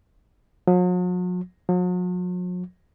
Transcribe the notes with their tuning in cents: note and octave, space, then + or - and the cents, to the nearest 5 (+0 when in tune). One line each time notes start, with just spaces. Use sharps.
F#3 -45
F#3 -45